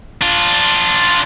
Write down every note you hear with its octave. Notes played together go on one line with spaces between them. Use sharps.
D4 F4